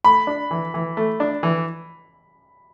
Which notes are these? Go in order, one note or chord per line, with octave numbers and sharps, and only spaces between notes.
A3 B5
D4
E3
E3
A3
D4
E3